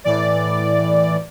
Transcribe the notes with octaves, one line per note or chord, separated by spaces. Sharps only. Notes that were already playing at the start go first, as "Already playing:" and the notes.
A2 E3 D5